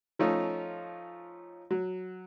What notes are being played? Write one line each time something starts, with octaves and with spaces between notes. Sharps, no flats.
F3 A3 C#4 D#4 F4
F#3